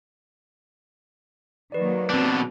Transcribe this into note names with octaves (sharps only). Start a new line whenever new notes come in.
D#3 F#3 A#3 B4 D5
B2 B3 C4 D4